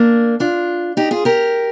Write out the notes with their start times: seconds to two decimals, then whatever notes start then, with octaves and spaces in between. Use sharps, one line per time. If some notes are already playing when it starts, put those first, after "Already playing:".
Already playing: A#3 D4
0.40 D4 F4
0.97 D#4 G4
1.11 F4 G#4
1.25 G4 A#4